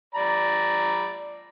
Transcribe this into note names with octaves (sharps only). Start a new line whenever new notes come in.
D5 A#5 B5